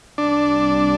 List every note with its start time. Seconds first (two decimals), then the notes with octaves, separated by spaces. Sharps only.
0.18 C2 C3 G3 D4